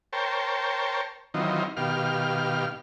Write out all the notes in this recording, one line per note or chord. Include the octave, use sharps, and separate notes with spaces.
A#4 C5 C#5 G5 A5
D#3 E3 F#3 C4 D#4 F4
B2 D#3 G4 F5 F6